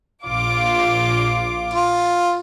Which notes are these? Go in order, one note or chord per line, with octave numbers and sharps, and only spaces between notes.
A#1 F4 D6
F4